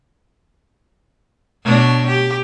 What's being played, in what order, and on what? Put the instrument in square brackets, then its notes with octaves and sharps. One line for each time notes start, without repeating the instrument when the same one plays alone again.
[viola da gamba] B2 D4 C#5
G4